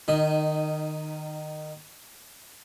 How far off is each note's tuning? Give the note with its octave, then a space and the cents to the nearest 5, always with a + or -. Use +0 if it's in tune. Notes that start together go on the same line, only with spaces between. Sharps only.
D#3 -25 D#4 +0 D#5 +0